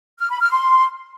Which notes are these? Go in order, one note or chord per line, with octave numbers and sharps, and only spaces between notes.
F6
B5
F6
C6